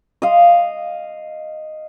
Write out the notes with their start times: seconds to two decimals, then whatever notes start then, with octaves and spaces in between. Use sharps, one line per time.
0.22 D#5 F5